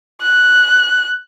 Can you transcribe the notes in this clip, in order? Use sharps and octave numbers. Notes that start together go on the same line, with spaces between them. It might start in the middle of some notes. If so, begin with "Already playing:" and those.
F#6